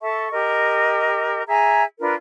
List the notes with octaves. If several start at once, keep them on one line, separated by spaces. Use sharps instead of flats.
A4 E5 A5 C#6
G4 A#4 D#5
G#4 E5 G#5 A#5
D4 F4 A#4 B4